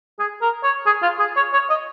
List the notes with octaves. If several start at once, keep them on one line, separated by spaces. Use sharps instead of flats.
G#4
A#4
C#5
G#4
F4
G#4
C#5
C#5
D#5